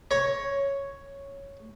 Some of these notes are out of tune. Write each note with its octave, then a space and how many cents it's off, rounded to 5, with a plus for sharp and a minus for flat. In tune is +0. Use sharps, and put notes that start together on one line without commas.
C#5 +0 A#5 +20